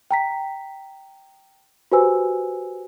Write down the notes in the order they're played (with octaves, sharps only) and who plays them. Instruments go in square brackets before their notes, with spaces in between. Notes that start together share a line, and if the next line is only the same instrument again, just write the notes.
[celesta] G5 A#5 B6
F#4 G4 B4 C5 G#5 E6